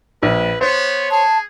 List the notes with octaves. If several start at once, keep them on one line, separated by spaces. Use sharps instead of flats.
A#1 B4
B3 C5 C#5
G#4 A5